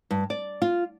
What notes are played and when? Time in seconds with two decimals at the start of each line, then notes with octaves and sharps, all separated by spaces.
0.11 G2
0.30 D5
0.62 F4